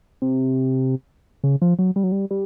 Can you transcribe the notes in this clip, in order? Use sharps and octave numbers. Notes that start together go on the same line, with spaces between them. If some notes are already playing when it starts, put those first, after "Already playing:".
C3
C#3
F3
F#3
G3
F#3
G3
G3